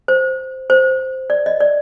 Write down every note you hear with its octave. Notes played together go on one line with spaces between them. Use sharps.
C5
C5
D5
D#5
D5